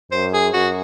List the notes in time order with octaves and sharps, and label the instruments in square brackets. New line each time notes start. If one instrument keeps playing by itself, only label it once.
[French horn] F#2 [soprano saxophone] C5
[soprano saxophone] G#4
[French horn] F#2 [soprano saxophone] F#4